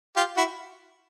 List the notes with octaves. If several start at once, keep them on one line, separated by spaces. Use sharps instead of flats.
F4 G4
E4 F#4